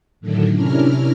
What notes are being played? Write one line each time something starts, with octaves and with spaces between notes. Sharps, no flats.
A2 D3 D#3 F#3 A3
C3 C#4 D4 E4 A#4 F6